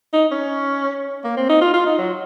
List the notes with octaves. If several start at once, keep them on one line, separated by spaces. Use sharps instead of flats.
D#4
C#4
A#3
C4
D#4
F4
F4
D#4
F#3